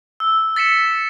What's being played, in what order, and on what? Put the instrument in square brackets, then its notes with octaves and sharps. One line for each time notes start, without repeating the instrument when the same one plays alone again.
[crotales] E6
A6 B6 C#7 E7